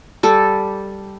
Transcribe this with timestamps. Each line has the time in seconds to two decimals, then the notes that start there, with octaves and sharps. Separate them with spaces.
0.23 G3 A4